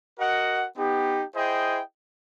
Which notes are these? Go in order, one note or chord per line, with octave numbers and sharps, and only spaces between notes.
F#4 A#4 D#5 F#5
B3 D#4 G4
E4 G#4 C5 D#5 G5